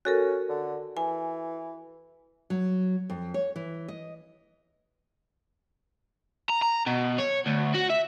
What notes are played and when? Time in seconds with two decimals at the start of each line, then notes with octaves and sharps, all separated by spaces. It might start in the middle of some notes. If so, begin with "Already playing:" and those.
0.05 C#4 F#4 A4 A#4
0.49 D3
0.97 E3 G#5
2.50 F#3
3.10 F2
3.34 C#5
3.56 E3
3.88 D#5
6.50 A#5
6.62 A#5
6.86 B2
7.18 C#5
7.46 D2
7.74 F#4
7.90 E5